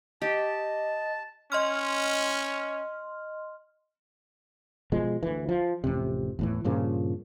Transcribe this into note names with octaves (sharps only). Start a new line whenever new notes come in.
G4 D#5 A5
C#4 D#5 C6 F6
B2 F3 G#3
D2 E3
F3
A1 F2 C3
E2 A2 E3
G2 A#2 C#3 F3